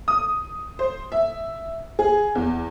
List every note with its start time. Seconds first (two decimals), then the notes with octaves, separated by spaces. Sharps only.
0.08 D#6
0.79 C5
1.12 E5
1.99 G#4
2.35 E2